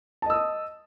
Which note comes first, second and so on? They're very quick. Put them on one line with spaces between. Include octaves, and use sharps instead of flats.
A5 D#5 E6 D#6